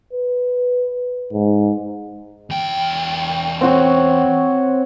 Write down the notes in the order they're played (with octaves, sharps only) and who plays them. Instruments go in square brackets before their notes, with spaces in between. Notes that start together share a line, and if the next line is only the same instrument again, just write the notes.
[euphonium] B4
G#2
[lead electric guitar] E2 G5
[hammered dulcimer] C4 F#4 C#5